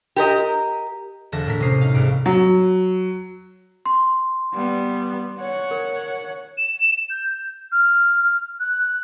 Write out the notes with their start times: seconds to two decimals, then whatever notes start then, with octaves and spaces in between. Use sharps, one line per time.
0.16 G4 A#4 D#5
1.32 E1 D3 A4 E5 A#6
1.47 A2 A#4 B6
1.60 C3 C#4 D#6 C7
1.81 D#4 F5
1.94 C2 G#2 D7
2.26 F#3
3.86 C6
4.54 G3 B3
5.39 C#5 F#5
5.71 A#4
6.57 E7
7.10 G6
7.72 F6
8.60 F#6